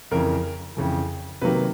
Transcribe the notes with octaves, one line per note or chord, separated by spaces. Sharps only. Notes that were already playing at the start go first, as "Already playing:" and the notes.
F2 C#3 E3 A#4
F2 C#3 E3
C3 D#3 F#3 A#3 B4